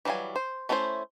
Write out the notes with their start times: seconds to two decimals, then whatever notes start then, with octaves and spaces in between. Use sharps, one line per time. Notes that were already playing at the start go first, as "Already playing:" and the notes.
0.05 E3 F#3 G3 F5 G#5
0.36 C5
0.69 A3 C#4 E4 A#4 C5